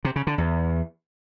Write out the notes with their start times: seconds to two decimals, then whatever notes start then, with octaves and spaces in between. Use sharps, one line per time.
0.05 C3
0.16 C#3
0.27 D3
0.38 E2